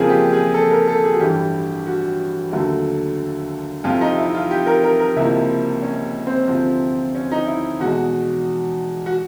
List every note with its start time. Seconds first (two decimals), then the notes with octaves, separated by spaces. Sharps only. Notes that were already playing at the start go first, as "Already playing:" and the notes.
Already playing: F2 C#3 F3 A#3 G#4
0.10 G4
0.33 G#4
0.54 A4
0.71 A#4
0.87 A4
1.04 G#4
1.12 F#4
1.20 A1 G2 E3 G4
1.87 F#4
2.52 D#2 D3 F#3 A3
3.84 F2 C3 F3 F4
4.01 D#4
4.18 E4
4.34 F4
4.51 G4
4.66 A#4
4.83 A#4
5.00 A#4
5.16 C#2 C3 F3 A#3 E4
5.82 C#4
6.27 C4
6.48 D2 C3 F3
7.15 C#4
7.31 D#4
7.47 E4
7.80 E2 B2 G#3 F#4
9.06 F#4